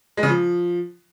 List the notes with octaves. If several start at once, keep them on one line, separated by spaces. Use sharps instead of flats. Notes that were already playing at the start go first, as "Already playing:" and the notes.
G#3
C#3
F3